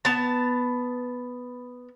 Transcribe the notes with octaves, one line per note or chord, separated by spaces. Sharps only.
B3 A5